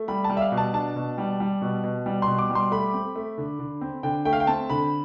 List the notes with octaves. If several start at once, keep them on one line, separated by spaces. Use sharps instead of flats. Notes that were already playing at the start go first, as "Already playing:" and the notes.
Already playing: A3
G3 B5
A5
G3
E5
F5
B2
A5
D4 A5
B2
G3
G3
B2
B2
G3
C6
B2
D6
G3
C6
A3 B5
C4
A3
D3
D3
C4
D3 G5
A3 G5
F5
G5
C4 A5
D3 B5